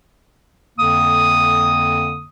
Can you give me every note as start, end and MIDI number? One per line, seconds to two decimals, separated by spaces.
0.79 2.27 41
0.79 2.27 50
0.79 2.27 58
0.79 2.27 87